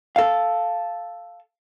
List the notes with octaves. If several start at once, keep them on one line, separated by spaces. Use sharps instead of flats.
A4 F5